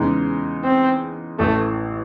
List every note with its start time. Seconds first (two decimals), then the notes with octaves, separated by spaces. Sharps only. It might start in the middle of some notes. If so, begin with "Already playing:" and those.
Already playing: E2 C#3 G#3 D#4
0.64 C4
1.39 A1 A2 E3 A3